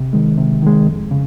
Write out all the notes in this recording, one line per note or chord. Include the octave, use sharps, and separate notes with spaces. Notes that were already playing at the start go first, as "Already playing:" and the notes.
Already playing: C3
D#3 G#3
C3
D#3 G#3
F2
C#3